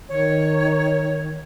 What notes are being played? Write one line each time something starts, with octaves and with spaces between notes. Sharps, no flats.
D#3 C#5